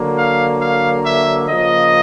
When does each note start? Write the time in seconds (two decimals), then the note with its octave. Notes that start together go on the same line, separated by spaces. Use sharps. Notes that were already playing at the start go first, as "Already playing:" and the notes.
Already playing: D3 F#3 A#3
0.14 F5
0.59 F5
1.04 E5
1.49 C#3 F3 A#3 D#5